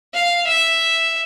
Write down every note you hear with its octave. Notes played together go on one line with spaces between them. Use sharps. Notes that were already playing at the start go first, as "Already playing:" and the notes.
F5
E5